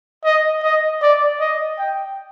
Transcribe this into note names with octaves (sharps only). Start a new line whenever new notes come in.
D#5
D#5
D5
D#5
G5